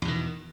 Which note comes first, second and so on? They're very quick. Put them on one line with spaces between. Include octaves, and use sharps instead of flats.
E2 B2 D#3